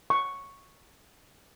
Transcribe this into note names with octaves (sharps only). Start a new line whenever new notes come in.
C#6